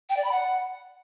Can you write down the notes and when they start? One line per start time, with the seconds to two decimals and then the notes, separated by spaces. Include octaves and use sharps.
0.10 G5
0.17 D5
0.24 B5
0.32 F#5